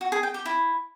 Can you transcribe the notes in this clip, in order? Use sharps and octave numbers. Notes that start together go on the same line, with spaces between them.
F#4
G#4
G5
G4
E4